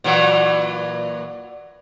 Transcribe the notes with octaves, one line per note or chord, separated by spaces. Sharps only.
A#2 E3 F#3